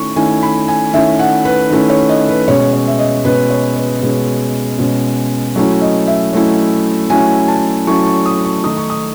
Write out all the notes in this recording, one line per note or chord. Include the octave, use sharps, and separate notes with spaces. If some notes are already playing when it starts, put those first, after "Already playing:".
Already playing: D#3 A3 C#4 E4 C#6
D#3 A3 C#4 E4 G#5
B5
G#5
D#3 A3 C#4 E4 E5
F#5
B4
D#3 A3 C#4 E4
C#5
D#5
B4
B2 G#3 C#4 C#5
C#5
E5
D#5
B2 G#3 C#4 B4
C#5
B4
B2 G#3 C#4
B2 G#3 C#4
F#3 A3 C#4 E4 C#5
D#5
E5
F#3 A3 C#4 E4
F#3 A3 C#4 E4 G#5
A5
F#3 A3 C#4 E4 C#6
C#6
D#6
C#6
D#3 A3 D#4 D#6
C#6
D#6